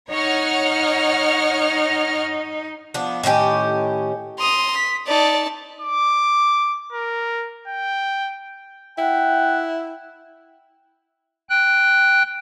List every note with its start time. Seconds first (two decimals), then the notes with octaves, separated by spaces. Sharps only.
0.12 D#4 C#5 F#5 F6
2.94 F3 B3 D4
3.24 A2 D#3 C#4 G4
4.39 A#5 C6 D#6
4.76 B6
5.07 D#4 D5 A5
5.81 D6
6.93 A#4
7.67 G5
8.98 E4 F#5 G5
11.50 G5 F#6